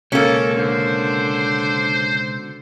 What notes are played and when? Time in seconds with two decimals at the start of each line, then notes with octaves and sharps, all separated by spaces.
0.12 C#2 B2 A#3 C#4 A4
0.54 D3 C5